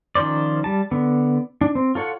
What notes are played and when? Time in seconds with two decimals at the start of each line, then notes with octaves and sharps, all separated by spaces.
0.15 D#3 F3 C#4 C5 D5
0.64 G3 A5
0.91 D3 B3
1.61 D4
1.75 C4
1.95 F4 A4 C#5 F#5